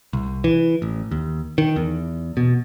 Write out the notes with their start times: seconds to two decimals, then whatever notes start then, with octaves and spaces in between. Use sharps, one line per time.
0.13 C2
0.44 E3
0.82 A1
1.11 D#2
1.58 D#3
1.76 E2
2.37 B2